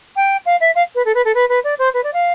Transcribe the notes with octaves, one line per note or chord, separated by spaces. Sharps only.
G5
F5
E5
F5
B4
A4
B4
A4
B4
B4
D5
C5
B4
D5
F5